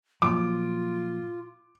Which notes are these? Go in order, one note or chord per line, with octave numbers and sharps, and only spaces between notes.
A#2 F3 F#3 F4 D6